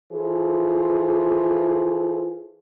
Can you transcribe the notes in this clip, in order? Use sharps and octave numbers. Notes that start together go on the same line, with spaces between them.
E3 F4 G#4 A4 C5